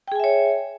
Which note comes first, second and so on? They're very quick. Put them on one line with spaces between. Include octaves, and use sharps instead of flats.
G5 G#4 G#5 E5 C#5